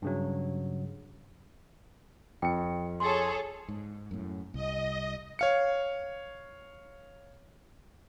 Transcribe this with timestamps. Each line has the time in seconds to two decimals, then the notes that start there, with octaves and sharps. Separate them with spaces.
0.02 G2 C#3 F#3
2.42 F2 G5 C#7
3.00 G#4 A4 C#5 C6
3.68 G#2
4.11 F#2 A2
4.54 C2 D#5
5.39 C#5 F5 C#7